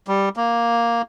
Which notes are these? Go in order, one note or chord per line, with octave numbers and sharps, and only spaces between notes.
G3
A#3